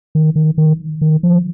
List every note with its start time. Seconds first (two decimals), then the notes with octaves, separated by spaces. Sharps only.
0.15 D#3
0.36 D#3
0.58 D#3
1.01 D#3
1.23 F3